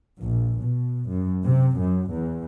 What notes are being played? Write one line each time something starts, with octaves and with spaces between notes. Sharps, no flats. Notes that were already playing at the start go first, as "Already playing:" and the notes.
A#1
B2
F#2
C3
F#2
E2